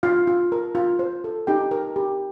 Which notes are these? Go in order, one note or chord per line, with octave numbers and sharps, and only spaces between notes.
F4 F5
F4
A#4
F4
C5
A4
D#4 G4 G5
A#4
G4